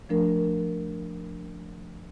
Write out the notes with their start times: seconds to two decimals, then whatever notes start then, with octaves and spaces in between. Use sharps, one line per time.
0.09 F3 A3 D4 A#4